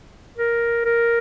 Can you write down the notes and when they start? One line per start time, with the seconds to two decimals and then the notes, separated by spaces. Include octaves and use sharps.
0.37 A#4
0.85 A#4